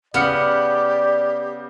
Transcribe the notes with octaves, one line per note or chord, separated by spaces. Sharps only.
C#3 B3 G4 D5 F#5 F6 C#7